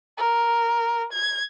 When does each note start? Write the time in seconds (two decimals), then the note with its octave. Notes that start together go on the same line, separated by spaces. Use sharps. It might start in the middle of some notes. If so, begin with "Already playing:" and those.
0.17 A#4
1.13 G#6